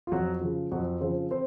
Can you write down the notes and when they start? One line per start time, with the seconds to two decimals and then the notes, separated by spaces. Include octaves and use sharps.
0.07 F4
0.12 F2 F#3 F#4
0.41 C#3 F3
0.71 F2 F#3 F#4
1.01 C#3 F3 C4 C5
1.31 C4 C5